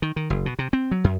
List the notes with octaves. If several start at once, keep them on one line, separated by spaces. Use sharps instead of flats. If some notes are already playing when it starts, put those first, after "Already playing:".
D#3
D#3
F#1
B2
C3
C4
F#3
F#2